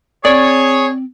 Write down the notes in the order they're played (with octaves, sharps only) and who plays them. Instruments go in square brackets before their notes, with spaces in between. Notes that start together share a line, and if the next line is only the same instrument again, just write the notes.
[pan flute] C4 [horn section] G#4 C#5 [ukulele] D5